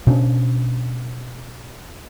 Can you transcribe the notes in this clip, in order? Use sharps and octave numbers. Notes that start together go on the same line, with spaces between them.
B2 C#4 D4